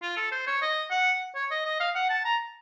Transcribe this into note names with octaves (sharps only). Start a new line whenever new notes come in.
F4
A4
C5
C#5
D#5
F#5
C#5
D#5
D#5
F5
F#5
A5
A#5